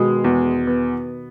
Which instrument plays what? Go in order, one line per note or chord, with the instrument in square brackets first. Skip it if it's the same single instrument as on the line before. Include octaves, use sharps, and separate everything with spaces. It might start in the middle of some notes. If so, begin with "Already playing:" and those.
Already playing: [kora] B2 D#3 [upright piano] G#3
[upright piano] E2
B3